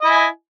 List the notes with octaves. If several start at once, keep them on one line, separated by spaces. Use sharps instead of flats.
E4 D#5 G#5